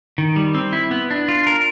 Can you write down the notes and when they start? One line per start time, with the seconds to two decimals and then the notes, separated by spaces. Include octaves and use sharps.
0.18 D#3
0.36 G3
0.55 C4
0.73 E4
0.91 B3
1.11 D4
1.29 F4
1.47 A#4